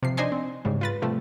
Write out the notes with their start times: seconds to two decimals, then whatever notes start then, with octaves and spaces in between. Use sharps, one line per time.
0.03 C3 F3 C7
0.17 D4 D#4 C5 D#5 G#5 C6
0.32 C4
0.65 G#2 C#3 G3
0.81 F4 B4 A6
1.02 C3 F3 G3 A3